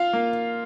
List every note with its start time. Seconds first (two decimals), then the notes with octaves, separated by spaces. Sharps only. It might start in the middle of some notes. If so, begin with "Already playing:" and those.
Already playing: F4 F5
0.13 A#3